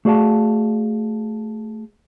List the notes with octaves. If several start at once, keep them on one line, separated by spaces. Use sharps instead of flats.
A3 F#4 G#4 D5 F5 A5